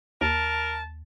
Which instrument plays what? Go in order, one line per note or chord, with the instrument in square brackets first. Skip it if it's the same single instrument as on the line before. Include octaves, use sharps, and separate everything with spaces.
[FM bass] D#2 [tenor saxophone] A#4 [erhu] A5